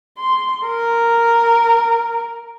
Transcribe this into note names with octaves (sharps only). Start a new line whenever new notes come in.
C6
A#4